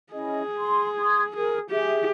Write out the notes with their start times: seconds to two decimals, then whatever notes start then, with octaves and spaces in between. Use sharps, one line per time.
0.13 C#4 E4 G#4 D#5
0.59 C6
0.99 C6 D#6 G#6
1.36 G#4 A#4
1.70 G4 G#4 E5